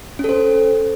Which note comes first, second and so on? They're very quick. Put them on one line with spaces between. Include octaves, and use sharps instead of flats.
C#4 A4 C5